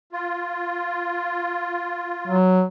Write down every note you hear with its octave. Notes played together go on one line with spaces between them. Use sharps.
F4
F#3